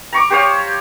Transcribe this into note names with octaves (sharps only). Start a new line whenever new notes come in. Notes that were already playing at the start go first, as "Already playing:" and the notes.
A#5 C#6 D6
G4 C5 C#5 F5